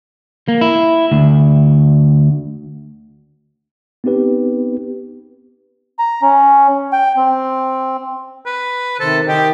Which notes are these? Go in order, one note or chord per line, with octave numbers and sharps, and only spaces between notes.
A#3
E4
D2
B3 C4 D#4 G4 B4
A#5
C#4
G5
C4
B4
C3 D#3 A4 C5
D#3 G4 D#5 G5